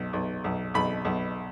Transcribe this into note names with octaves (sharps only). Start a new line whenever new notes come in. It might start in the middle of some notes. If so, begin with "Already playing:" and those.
Already playing: B1
B1
B1
B1 B5
B1